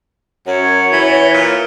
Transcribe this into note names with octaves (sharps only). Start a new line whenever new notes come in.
F#2 C#5
E3
A#2